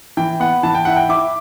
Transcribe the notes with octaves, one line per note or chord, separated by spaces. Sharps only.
E3 G5
B3 F#5
E3 A5
G5
E4 F#5
G5
E4 D6